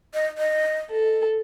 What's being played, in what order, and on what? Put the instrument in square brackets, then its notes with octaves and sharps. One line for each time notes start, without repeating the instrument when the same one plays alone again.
[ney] D#5
D#5
[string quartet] A4